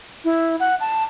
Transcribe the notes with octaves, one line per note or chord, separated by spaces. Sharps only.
E4
F#5
A5